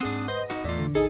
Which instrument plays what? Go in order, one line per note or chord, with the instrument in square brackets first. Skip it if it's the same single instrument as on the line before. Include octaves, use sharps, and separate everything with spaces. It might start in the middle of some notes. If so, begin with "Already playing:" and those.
[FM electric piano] G#2 G#4 F#5 [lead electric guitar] C4 D4 [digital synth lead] D#6
[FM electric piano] B4 [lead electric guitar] C5 [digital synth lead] D#5
[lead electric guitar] D#4 F#4
[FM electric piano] E2 A2 D5 [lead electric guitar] A3 F4
[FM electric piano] D3
[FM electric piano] A1 D#4 D#6 [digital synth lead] G#4 [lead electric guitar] A4